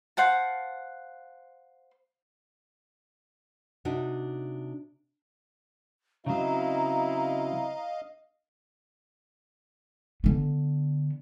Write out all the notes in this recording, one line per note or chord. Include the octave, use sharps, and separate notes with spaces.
C5 F5 F#5 A5
C3 D4 D#4 F#4
C#3 F#3 C4 E4 D#5 F5 A#5
D3 B3